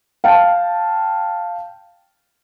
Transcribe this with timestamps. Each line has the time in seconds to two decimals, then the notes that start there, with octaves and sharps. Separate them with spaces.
0.24 F5 G5 A5